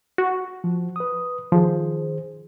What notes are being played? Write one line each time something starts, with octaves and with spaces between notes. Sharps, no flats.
F#4
F3
B4 D#6
D#3 F3 G#4 C5